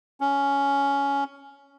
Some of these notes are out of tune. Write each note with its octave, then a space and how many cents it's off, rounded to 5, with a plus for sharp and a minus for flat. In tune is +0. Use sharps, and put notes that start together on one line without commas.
C#4 +10